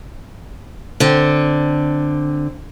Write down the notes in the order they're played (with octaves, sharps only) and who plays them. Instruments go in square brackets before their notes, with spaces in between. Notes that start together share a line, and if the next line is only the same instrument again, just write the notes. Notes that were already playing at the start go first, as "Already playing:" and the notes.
[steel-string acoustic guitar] D3 C4